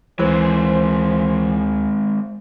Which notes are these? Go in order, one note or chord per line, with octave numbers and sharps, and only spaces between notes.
D2 E3 G#3 C4 C5